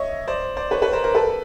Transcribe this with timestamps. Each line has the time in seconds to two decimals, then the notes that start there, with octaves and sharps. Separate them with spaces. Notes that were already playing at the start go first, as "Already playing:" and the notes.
Already playing: C#5 D#5 E5
0.27 C5 D5
0.57 C5 D5
0.71 B4 C#5
0.82 B4 C#5
0.92 A#4 C5
1.04 A#4 C5
1.15 A4 B4